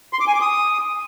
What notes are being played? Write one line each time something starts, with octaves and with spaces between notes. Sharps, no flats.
C6
D6
G#5
D6
D#6